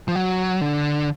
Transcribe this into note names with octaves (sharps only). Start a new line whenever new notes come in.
F3
F#3
D3